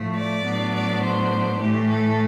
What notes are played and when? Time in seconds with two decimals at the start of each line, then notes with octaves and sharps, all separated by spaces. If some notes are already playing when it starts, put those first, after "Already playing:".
Already playing: A2 F3 A3
0.15 D5
0.44 A2 F#3 B3 D4
0.73 D5
1.01 C5
1.60 A2 E3 A3 G4
1.89 A4